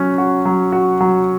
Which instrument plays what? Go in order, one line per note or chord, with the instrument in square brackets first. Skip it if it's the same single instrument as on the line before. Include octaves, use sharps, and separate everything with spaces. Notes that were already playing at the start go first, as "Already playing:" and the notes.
Already playing: [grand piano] F#3 C#4
F#4
F#3
F#4
F#3